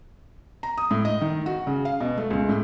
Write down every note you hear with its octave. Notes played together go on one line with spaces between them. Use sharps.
A#5
D#6
A2
D#5
D#3
F#4
C#3
F5
B2
A3
C#2
A2